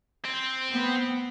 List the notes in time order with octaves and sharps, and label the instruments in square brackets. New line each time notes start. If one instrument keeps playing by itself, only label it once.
[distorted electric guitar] C4
[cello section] B3